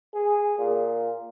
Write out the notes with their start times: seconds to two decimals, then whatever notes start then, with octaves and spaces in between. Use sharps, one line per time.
0.14 G#4
0.58 A#2